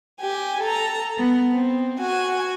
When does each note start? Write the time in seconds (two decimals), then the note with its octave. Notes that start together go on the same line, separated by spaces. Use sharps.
0.21 G4 G#5
0.61 A4 A#5
1.17 B3
1.52 C4
1.99 F#4 G#5